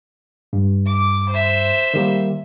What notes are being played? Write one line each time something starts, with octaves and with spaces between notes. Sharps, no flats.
G2
D6
C5 E5
D#3 G3 A#3